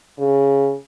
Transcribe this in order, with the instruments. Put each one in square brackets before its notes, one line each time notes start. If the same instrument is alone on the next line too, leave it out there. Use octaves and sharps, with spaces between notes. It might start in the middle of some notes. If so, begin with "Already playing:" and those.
[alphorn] C#3